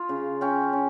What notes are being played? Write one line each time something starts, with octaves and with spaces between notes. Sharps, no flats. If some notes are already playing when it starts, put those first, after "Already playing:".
Already playing: F4
C#3
C#4 G5
C#4